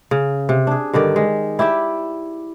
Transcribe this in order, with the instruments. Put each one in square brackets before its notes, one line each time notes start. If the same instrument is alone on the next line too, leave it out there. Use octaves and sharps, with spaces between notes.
[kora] C#3
C3
D4 G#4
G2 D3 D#3 D5
G#3
E4 G4 D5 E5